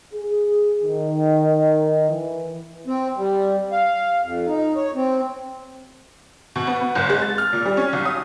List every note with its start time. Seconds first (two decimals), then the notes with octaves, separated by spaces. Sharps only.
0.14 G#4
0.83 D#3
2.09 E3
2.87 C4
3.17 G3
3.72 F5
4.23 F2
4.47 D#4
4.76 C#5
4.95 C4
6.56 B2
6.67 B3
6.81 B3
6.95 F#1
7.10 G#3
7.22 A6
7.38 F6
7.53 A#2
7.65 G3
7.77 C#4
7.93 B1
8.05 D#6